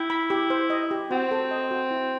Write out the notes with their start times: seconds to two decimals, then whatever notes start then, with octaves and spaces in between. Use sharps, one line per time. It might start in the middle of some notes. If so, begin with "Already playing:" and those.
Already playing: E4 G5
0.10 B5
0.30 G4
0.50 C5
0.70 D#5
0.91 G4
1.11 C4 F#4
1.31 A4
1.51 D#5
1.71 F#4
1.91 E4